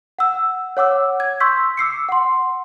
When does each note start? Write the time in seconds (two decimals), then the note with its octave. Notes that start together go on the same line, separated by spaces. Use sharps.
0.19 F#5 E6
0.77 C#5 F#5 D6 E6
1.20 G#6
1.40 C6 C#6 E6 G6 B6
1.77 D6 E6 C7 C#7
2.09 F#5 C6